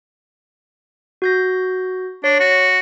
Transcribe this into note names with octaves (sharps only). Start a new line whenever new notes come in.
F#4 G6 A#6
D4 C#5
F#4